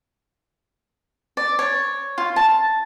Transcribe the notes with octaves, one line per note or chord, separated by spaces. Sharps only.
D5
C#5
F4
A5